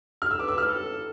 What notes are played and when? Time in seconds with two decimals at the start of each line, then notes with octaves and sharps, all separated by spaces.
0.22 F6
0.31 E6
0.39 B4 D6
0.48 E6
0.58 F6
0.68 A4